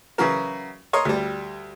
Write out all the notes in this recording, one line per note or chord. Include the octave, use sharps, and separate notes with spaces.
C#3 E3 F#3 F#4 A#4
A#4 C#5 D#5 C6
D2 G3